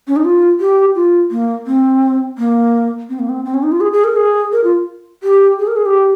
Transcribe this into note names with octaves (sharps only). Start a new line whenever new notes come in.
C#4
D#4
F4
G4
F4
A#3
C4
A#3
C4
A#3
C4
C4
C#4
D#4
F4
G#4
G#4
A#4
G#4
A#4
F4
G4
G#4
A#4
G#4
G4